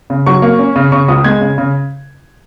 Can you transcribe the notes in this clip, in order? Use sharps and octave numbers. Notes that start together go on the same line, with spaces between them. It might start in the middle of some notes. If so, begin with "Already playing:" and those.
C#3
F#3 C#6
A#3
C#4
C#3
C#3 C#6
C#2 D#6
G#3 G#6
C#3
C#3